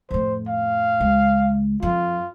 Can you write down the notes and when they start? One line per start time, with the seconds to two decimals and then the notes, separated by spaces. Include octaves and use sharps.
0.11 F2 A2 C5
0.49 F5
1.00 C#2 G#3
1.82 F2 F4